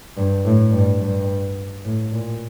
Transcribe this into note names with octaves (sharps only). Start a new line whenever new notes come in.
G2
A2
G2
G2
A2
A#2